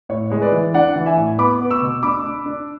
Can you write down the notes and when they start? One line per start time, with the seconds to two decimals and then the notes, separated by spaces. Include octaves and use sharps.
0.09 A2 C#5
0.30 G#3 C#5
0.41 B4 D5
0.52 E3
0.74 D4 D5 F#5
0.96 E3
1.06 E5 G#5
1.17 A2
1.38 B3 B5 D6
1.60 B3
1.71 C#6 E6
1.82 B2
2.03 D4 B5 D6
2.24 D4
2.46 D4